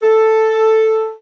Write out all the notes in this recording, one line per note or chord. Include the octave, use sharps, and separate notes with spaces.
A4